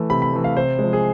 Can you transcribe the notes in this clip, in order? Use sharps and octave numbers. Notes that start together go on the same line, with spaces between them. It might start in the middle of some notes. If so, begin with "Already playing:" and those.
Already playing: E3 A3
C3 B5
B5
E3 A3
F5
C3 C5
F3 G#3
G#4